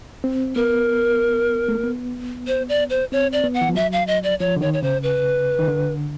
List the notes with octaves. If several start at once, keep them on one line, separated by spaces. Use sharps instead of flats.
C4
B3 A#4
A3
A#3
B3
C5
D5
C5
C4 C#5
D5
B3
F#5
E3
F3
F#3 E5
F5
D#5
D5
F3 C#5
D3
D#3 C#5
C#5
C#3 C5
B4
D#3
D3